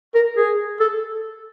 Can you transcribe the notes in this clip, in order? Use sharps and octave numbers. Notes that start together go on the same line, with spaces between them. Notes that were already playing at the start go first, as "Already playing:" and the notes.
A#4
G#4
A4